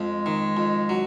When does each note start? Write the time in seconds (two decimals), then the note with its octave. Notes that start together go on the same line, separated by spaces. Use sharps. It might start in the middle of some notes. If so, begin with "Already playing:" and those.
Already playing: F2 G#3
0.26 D#3
0.57 F2
0.89 F#3